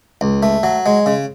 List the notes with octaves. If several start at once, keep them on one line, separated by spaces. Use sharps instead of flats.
C#2
A3
F#3
G#3
C#3